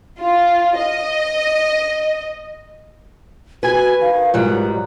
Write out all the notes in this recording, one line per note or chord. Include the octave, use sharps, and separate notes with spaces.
F4
D#5
F#4 B4 G#5
D#3 F5
G#2 F#3 G3 F4